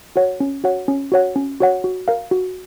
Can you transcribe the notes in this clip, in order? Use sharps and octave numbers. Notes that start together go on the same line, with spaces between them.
F#4 C#5 F#5
C#4
F#4 C#5 F#5
C#4
F#4 C#5 F#5
C#4
F#4 C#5 F#5
F#4
A#4 F5
F#4